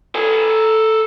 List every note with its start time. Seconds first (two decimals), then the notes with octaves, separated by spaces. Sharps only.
0.15 A4 G#5